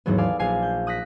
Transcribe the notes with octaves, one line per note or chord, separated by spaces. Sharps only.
D#2 G#2 E3 F#3 B3
A4 D5 F5 G#5
A#1 F5 G#5 C7
G6
D#6 F#6 A#6 B6